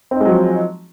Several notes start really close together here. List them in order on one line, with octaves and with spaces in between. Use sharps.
C4 D#4 G#3 F#3 F3